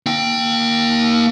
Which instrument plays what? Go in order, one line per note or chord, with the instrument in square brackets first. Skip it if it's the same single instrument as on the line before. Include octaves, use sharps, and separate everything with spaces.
[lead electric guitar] A#3 G5